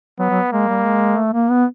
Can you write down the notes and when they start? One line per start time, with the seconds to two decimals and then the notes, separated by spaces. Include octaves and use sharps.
0.19 F#3 B3
0.30 F#3
0.52 G#3 A#3
0.68 G3
0.85 G#3
1.18 A3
1.34 A#3
1.50 B3